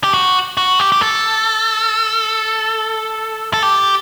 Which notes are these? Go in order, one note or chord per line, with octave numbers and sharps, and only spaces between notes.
G4
F#4
F#4
G4
G4
A4
A4
G4